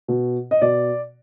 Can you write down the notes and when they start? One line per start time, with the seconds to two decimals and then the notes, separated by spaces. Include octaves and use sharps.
0.08 B2
0.51 D#5
0.62 B2 D5